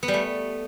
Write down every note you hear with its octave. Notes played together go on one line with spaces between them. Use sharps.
B3
G3
A3